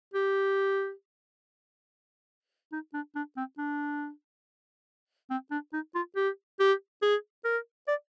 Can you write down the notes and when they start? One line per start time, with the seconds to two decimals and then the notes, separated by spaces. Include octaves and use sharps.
0.14 G4
2.72 D#4
2.94 D4
3.15 D4
3.37 C4
3.58 D4
5.30 C4
5.51 D4
5.73 D#4
5.95 F4
6.16 G4
6.60 G4
7.02 G#4
7.44 A#4
7.88 D5